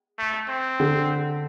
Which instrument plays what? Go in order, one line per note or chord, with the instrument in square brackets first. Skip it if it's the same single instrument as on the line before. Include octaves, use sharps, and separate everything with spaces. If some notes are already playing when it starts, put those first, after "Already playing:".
[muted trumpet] A3
C4
[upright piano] D3